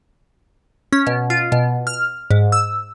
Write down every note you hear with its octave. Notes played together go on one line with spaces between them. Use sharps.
C#4
B2
F4
B2
F6
G#2
E6